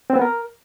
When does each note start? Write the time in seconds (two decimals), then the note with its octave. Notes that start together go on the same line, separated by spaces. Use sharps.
0.10 C4
0.16 B3
0.22 A#4